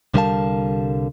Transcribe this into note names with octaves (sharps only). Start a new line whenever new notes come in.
C2 D3 G3 A#4 F5 A5